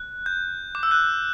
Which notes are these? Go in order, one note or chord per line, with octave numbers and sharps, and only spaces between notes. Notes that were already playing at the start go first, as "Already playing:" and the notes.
Already playing: F#6
G6
D6
E6
F#6